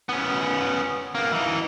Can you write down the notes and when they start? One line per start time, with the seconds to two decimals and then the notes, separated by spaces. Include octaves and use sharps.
0.09 B3 C#4
1.15 A#3 B3
1.32 E3 D#4